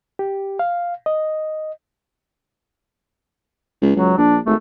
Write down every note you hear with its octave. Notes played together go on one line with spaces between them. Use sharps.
G4
F5
D#5
C#2
C#2 F#3
A#1 D4
G#1 A3